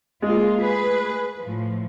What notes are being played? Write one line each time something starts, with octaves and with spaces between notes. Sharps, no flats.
G#3 A#3 F4
A3 G#4 B4
A2 F3